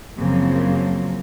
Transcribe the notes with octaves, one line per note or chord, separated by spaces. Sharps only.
F#2 C#3 F3 F#3 A#3 C4